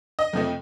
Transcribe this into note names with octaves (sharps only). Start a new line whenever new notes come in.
D#5
F2 C3 F3 A3